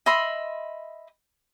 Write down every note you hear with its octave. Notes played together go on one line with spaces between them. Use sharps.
D#5 E5 B5 C6